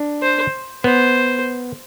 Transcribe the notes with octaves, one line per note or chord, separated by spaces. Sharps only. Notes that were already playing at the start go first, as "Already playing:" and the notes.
Already playing: D4
C5
B3 C5